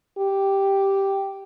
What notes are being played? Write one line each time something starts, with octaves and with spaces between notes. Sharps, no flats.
G4